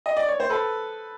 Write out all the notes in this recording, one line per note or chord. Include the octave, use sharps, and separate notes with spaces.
D#5
D5
C#5
C5
A4 B4